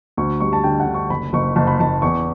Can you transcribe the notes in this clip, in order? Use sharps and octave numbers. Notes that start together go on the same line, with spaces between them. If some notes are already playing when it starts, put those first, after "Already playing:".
D2 C#6
G3 C#6
A5
D3 G5
F#5
D3
C#6
F#1 B5
F#1 C#6
F#1 A5
B5
F#1 A5
E2 C#6